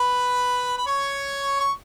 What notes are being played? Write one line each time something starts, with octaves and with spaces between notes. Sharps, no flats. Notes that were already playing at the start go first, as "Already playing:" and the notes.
Already playing: B4 B5
B5
C#5 C#6
C#6